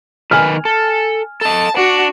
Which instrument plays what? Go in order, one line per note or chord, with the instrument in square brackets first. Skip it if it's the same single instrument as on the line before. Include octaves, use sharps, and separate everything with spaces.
[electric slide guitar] D#3 B4 [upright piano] G#5 F6
[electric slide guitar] A4
[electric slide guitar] A4 D#5 [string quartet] A5
[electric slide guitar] D4 [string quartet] F#4